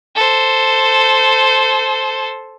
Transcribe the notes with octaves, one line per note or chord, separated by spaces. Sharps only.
A4 C5